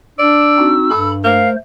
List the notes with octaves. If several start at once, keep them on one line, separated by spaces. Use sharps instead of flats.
D4 D5 E6
C4 D#4 F#4
G2 A4 B5
A3 A#4 C5 F5